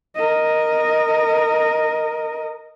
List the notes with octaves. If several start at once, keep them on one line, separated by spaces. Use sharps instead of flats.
A#4 D#5